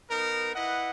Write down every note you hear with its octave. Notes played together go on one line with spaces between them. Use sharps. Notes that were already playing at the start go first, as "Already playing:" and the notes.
B3 D#4 A#4
E4 B4 D#5 F#5